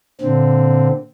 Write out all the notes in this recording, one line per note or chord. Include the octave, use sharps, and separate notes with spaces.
A#2 D3 C4